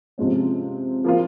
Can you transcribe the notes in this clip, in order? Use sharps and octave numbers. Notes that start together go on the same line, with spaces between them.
C3 F3 G#3 C#4
F3 A#3 F4